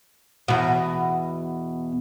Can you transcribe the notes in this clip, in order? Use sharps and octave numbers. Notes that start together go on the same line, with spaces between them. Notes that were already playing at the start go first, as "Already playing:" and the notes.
E2 B2